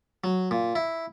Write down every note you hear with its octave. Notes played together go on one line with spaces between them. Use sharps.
F#3
A#2
E4